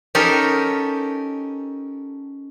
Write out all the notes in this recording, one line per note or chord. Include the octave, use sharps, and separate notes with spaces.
C#4 D#4 G4 A4 A#4